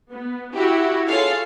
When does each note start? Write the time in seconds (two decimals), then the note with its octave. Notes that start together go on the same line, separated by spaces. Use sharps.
0.12 B3
0.56 E4 F#4 G4
1.08 F4 G#4 A4 C#5 F5